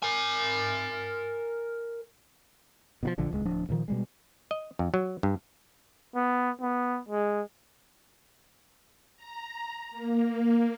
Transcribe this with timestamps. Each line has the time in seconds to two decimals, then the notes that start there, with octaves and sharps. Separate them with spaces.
0.02 A#4 G#5
3.03 B2 D#3 F3
3.18 A#1 D3 F3
3.31 D1 C#2 G#3
3.45 D1 F3 D4
3.69 D2 A#2 D#3 F3
3.88 B2 G3 G#3
4.51 D#5
4.79 F2
4.94 F#3
5.23 G2
6.15 B3
6.61 B3
7.09 G#3
9.17 A#5
9.91 A#3